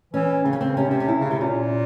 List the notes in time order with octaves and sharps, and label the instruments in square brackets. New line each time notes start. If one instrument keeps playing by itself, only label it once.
[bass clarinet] E3 [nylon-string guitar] C#4
[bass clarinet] C#3 [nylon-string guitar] C4
[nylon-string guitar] C#4
C4
[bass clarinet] C3 [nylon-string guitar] C#4
[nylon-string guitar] C4
C#4
E4
[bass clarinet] C#3
[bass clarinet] C3 [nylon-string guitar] C4
[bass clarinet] A#2 [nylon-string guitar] C#4